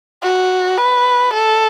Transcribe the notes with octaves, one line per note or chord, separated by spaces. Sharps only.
F#4
B4
A4